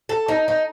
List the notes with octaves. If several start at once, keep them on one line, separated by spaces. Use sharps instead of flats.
A4
D#4
D#4